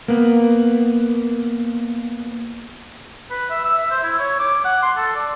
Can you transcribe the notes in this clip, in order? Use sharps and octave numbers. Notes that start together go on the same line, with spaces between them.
A#3 B3
B4
E5
E6
E5
C5
E4
C#5
D6
F#5
C6
A4
D5